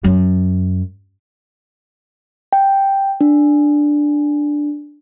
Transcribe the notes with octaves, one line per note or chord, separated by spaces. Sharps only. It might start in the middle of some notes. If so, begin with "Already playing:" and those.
F#2
G5
D4